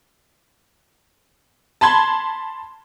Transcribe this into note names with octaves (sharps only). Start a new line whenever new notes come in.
A5 B5 C6 G#6